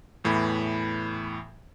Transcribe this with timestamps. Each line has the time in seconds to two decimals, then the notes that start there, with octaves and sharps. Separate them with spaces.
0.24 E2 A2 E3 B5 G#6